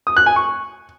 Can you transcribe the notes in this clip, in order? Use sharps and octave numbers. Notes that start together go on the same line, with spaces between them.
D#6
F#6
G#5
C#6